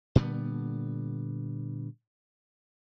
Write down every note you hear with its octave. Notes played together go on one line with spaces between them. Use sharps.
A#2 D3 G3 B3